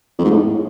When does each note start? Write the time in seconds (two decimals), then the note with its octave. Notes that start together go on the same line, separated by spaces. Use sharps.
0.18 F2
0.24 G#2
0.30 A2